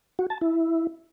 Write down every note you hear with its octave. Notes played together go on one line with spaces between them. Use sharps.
F#4
A5
E4